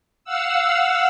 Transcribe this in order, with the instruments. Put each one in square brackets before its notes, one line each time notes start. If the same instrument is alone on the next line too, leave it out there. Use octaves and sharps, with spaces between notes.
[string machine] F5 F#5 E6